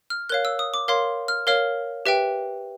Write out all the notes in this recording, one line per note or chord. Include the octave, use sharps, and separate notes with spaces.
F6
A#4 C#5 F5 F#6
E6
D#6
D6
A#4 C#5 F5 C6
F6
A#4 C#5 F5 F6
G4 B4 E5 G5